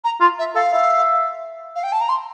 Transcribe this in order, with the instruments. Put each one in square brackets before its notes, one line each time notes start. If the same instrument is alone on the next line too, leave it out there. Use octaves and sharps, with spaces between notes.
[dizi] A#5
[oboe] F4 [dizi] C6
[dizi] E5
[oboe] A4 [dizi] F5
[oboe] E5
[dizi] F5
G5
A5
A#5
C6